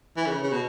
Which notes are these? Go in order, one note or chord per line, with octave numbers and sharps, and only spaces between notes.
E3
C#3
C#3
B2